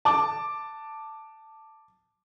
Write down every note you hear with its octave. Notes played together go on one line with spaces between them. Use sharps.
A5 D6